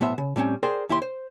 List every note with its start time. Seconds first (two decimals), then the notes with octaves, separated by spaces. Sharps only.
0.01 B1 A2 B3 C5 E5
0.18 C#3
0.36 A2 G3 C4 C#4
0.63 G#4 A#4 C5 D5 G5
0.89 D#2 E4 G4 C6
1.02 C5